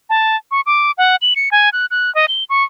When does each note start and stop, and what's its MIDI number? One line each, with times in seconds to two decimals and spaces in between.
0.10 0.36 81
0.51 0.61 85
0.66 0.91 86
0.98 1.16 78
1.22 1.34 102
1.36 1.49 97
1.52 1.69 80
1.73 1.86 90
1.91 2.13 90
2.15 2.26 75
2.28 2.44 103
2.50 2.64 85